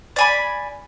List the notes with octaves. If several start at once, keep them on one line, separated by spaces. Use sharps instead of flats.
D5 G#5 B5